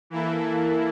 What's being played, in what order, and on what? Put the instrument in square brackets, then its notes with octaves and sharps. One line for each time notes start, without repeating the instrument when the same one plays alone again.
[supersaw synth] E3 A#3 E4 A4